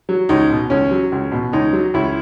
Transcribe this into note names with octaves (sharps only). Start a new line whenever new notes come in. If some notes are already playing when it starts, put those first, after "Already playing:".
F#3
C#2 D#4
B2
C#2 C#4
F#3
C#2
B2
C#2 D#4
F#3
C#2 E4